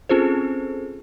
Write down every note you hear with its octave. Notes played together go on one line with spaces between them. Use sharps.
C4 C#4 F4 G#4 A4 C5